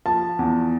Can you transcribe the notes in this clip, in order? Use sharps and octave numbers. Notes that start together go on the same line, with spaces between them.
F3 A5
E2